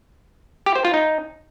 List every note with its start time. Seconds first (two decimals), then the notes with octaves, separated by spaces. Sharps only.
0.66 G4
0.75 C5
0.85 F4
0.94 D#4